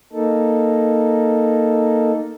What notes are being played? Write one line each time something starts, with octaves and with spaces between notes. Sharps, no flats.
A#3 D#4 A4